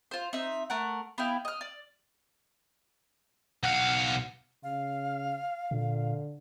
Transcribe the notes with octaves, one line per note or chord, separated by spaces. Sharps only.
F4 C5
C4 D#4 E5
A3 A#4 F#5
B3 E4 F5 G5
D#5 F6
D5
B1 F5 F#5
C#3 F5
A#2 D3